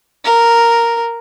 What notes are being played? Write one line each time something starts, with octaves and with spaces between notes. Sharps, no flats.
A#4